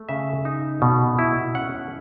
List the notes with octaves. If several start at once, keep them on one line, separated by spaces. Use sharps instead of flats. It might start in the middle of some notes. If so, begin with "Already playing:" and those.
Already playing: A3
C#3 E5
D#4
B2
E4
C#4 F#5